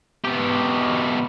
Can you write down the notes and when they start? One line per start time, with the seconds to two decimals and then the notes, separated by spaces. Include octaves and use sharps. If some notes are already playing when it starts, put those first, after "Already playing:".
0.24 B2 G4